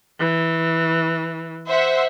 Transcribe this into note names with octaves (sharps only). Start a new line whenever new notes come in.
E3
C5 E5 F#5